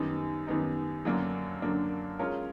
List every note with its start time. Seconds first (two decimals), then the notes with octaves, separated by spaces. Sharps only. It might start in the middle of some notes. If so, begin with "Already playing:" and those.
Already playing: F#2 D#3 G3 B3 D#4
0.47 F#2 D#3 G3 B3 D#4
1.05 F#2 D3 F#3 A#3 D4
1.62 F#2 D3 F#3 A#3 D4
2.19 G#3 C#4 F4 A#4 C#5